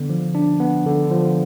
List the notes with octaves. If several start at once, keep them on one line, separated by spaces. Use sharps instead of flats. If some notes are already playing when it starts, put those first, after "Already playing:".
Already playing: D3 B3
F3
D4
B3
D3
F3